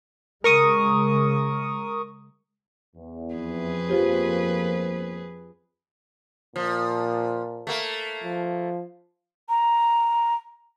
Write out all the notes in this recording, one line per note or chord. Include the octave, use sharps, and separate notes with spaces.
C#3 G#3 A#4 C#6 D#6
E2
F2 G#4 B4
G1 F3 A#3 F4 G4 C5
A#2 F3
A3 A#3
F3
A#5